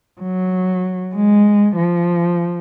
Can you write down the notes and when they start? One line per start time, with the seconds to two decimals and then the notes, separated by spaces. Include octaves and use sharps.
0.21 F#3
1.15 G#3
1.77 F3